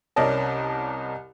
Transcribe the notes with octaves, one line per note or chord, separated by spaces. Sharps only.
C2 C#4 A#4 D5 D#5 A5